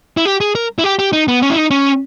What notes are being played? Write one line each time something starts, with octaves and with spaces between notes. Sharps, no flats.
E4
G4
G#4
A#4
E4
G4
G4
D#4
B3
C#4
E4
D#4
C#4